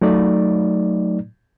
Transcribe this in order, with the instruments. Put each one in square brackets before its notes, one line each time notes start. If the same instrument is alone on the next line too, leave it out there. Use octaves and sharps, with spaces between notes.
[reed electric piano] F#3 A3 D#4 D5